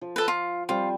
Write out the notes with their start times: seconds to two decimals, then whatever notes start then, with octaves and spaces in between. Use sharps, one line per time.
0.01 F3
0.16 A4 B4
0.28 F4
0.69 F3 G3 C4 F4